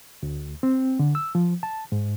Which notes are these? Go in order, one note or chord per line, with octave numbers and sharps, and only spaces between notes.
D2
C4
D3
E6
F3
A5
G#2